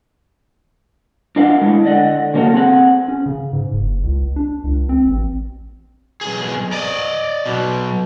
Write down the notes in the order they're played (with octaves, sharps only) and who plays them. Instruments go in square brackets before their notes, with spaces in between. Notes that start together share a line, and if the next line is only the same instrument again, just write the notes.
[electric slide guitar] D4 F4 A#4 D#5 F5 F#5
G#3 A3 E4
D3 D5 D#5 F#5
C#3 F#3 A#3 A4 F5 F#5
C4 G#4 F#5
[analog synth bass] C#4
C#3
G#2
F#1
C#2
D4
C#2
C4
A1
[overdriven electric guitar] B1 G#4
D5 D#5
B1 B2